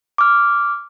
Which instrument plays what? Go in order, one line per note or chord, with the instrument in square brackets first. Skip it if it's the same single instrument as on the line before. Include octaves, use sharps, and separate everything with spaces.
[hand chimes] D6 F6